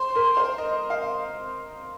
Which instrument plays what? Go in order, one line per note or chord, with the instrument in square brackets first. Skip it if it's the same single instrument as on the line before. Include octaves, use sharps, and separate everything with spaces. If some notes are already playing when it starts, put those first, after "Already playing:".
Already playing: [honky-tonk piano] C5 [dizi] C6
[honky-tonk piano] A#4
C5
D#5
F5